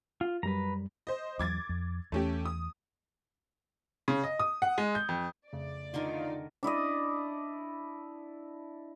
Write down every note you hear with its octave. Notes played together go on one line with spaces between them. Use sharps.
F4
F#2 G3 B4 A#5
C5 D#5
E2 F#3 D6 G#6 A6
F2
E2 A3 C#4 G4
D#6
C#3
D#5
D#6
F#5
G#3
G6
F2
F2 C#3 A3 D5
D3 D#3 D#4 F4 A#4
D4 E4 D5 D#5